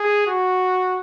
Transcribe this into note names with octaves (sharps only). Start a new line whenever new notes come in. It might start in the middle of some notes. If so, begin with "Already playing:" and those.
Already playing: G#4
F#4